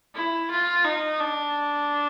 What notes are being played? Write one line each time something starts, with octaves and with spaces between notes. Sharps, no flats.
E4
F4
D#4
D4